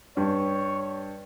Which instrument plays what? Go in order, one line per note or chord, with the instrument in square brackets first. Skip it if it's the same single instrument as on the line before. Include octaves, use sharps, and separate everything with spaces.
[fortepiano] G2 [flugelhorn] C#5